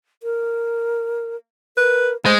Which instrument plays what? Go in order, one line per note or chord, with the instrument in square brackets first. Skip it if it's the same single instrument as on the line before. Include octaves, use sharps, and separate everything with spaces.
[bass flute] A#4
[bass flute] A#4 [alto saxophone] B4
[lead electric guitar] G#3 [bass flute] A3 [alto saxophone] C5